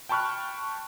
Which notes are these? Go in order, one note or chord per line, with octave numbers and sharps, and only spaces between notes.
G5 A5 B5 C#6 F6 F#6